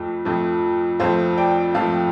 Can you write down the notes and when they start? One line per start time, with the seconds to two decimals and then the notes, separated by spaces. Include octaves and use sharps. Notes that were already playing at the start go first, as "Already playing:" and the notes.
Already playing: F2 F3 A3
0.25 F2 F3 A3
1.00 F2 F3 A3 C5 F5
1.37 D5 G5
1.75 F2 F3 A3 F5 A5